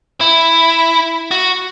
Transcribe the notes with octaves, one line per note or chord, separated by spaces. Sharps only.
E4
F#4